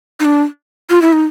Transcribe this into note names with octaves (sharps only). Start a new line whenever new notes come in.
D#4
D4
F4
E4
D#4